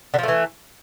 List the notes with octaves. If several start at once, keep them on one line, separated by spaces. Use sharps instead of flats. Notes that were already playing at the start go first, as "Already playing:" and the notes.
D3 E3 F3 A3